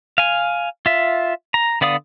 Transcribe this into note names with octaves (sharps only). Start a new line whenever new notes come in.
F5 G#5
F4 E5
A#5
D3 B3 D5 F5 D#6